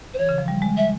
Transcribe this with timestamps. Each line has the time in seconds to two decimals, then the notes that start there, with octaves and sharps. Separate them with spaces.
0.14 C5
0.18 E3 C#5
0.29 C#3
0.38 F3
0.48 G3
0.62 G#3
0.77 E5